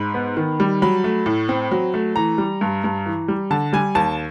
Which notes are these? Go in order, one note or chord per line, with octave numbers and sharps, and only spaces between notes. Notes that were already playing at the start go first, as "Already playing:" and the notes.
Already playing: G#2 B5
B3
D#3
G3
F#3 B5
A3
A2
C4
F#3
A3
E3 A#5
G3
G2
G2
E3
G3
D3 A5
G3 G#5
D#2 A5